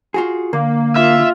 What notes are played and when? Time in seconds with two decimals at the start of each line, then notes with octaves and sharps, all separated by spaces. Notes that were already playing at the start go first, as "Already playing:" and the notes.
0.14 F4 F#4 G#4
0.53 D3 A#3
0.96 F4 E5